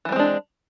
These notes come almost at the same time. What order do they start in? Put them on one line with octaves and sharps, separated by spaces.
E3 G3 C4 G#3 D4